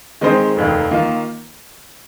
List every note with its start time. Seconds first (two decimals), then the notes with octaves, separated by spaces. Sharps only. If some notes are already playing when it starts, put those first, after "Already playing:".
0.21 D#3 G#3 C4 D#4 C5
0.56 F1 D#2 D#3
0.91 D#3 A#3 F4